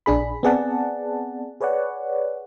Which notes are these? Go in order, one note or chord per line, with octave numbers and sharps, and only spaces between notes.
A#1 D4 G#4 B5
B3 C4 G#4 D5 F#5 A5
G#4 B4 C#5 D5 F#5